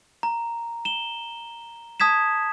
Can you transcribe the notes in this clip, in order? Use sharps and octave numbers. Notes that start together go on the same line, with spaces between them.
A#5
E7 G7
A5 D#6 G#6 B6 E7